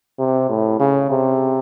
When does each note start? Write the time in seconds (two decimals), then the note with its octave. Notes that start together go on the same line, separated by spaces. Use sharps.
0.19 C3
0.49 A2
0.80 C#3
1.10 C3